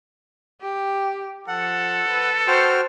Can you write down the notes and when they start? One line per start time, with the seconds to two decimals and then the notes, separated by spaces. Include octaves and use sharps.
0.61 G4
1.48 F3 A4 F#5
2.09 B4
2.47 F#4 C5 G5 F6